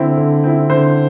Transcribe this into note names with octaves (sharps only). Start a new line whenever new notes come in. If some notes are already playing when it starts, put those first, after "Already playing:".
Already playing: D3 C4 E4
D3
C4 E4
D3 C5